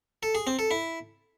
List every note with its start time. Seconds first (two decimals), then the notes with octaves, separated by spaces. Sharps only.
0.23 A4
0.35 G#4
0.47 C4
0.59 A4
0.71 E4